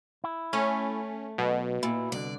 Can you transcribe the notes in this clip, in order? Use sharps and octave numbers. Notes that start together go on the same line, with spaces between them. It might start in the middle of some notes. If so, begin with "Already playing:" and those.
E4
A3 C#4
B1 B2
A#2 E4
C2 D3 D5